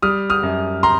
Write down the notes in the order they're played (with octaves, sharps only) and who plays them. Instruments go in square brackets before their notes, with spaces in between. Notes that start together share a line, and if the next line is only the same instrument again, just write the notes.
[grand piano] G3 D#6 F6
D#6 F6
F#2
A#5 C6